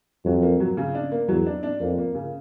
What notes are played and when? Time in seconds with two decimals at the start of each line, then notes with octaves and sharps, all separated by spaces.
0.25 F2 F#3
0.42 A#3
0.60 F#3
0.77 C#3
0.95 D4
1.12 A#3
1.28 E2 F#3
1.46 D4
1.63 D4
1.80 F2 A#3
1.98 A#3
2.15 C#3